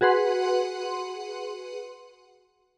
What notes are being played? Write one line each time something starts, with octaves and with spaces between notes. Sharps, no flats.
F#4 G#4 B4 F#5 C6